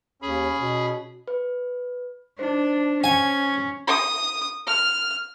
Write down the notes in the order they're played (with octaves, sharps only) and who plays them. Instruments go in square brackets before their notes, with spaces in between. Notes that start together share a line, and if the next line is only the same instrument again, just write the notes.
[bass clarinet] D#2 [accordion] C#4 B5 [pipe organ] G#4
[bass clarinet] B2
[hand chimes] B4
[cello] D4 [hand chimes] D#4 C5
[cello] C#4 [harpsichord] G#5
[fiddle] D#6
F6